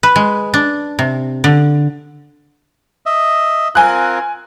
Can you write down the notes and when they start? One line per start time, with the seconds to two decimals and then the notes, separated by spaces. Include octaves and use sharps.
0.03 B4
0.16 G#3
0.54 D4
0.99 C3
1.44 D3
3.06 D#5 E5
3.75 C4 F4 A#4 G#5 F#6